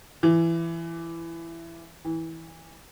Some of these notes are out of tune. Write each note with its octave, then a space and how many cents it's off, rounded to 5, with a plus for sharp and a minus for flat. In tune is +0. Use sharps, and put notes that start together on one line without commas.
E3 +15
E3 -20